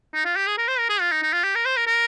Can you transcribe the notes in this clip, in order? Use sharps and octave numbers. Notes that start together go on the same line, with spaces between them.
D#4
F4
G4
G#4
A#4
C5
A#4
G#4
F4
D#4
D#4
F4
G4
A#4
C5
A#4
A#4